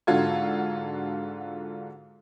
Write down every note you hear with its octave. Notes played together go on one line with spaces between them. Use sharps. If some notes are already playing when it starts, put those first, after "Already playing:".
G#2 D3 F4 F#4 A4 G#6